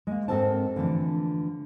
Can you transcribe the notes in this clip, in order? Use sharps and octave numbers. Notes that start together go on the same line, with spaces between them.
G#3 A#3
G#2 C4 A4 A#4 C5 A5
D3 E3 F3 A3 D4